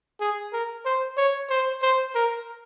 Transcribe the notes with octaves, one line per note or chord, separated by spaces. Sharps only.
G#4
A#4
C5
C#5
C5
C5
A#4